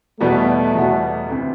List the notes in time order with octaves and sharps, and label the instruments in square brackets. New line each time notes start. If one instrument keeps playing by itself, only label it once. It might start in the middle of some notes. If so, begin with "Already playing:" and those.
[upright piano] E2 B2 G3 B3 F#4 [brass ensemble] A3
[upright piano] E2 B2 G3 B3 F#4
D2 C3 E3 B3